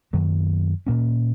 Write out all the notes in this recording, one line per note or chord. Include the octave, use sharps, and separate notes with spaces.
F#2 D#3 F#3 A#3
A#2 A#3 C#4